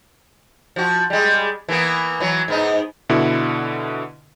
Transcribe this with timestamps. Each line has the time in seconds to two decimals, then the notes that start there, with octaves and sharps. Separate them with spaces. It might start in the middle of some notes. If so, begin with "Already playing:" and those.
0.76 F3 F#4
1.10 G3 G#3
1.68 E3 A#3 B3
2.20 E3 F#3
2.48 G#2 B3 D#4
3.09 B2 D3 E4